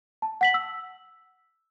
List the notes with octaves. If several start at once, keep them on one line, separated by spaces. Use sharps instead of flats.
A5
F#5 B6 F#7
E6